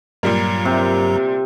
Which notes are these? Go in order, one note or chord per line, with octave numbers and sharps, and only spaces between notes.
G2 A#2 F#3 G3 A#3 A#5
C3